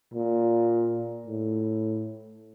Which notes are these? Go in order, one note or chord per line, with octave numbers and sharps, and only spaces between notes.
A#2
A2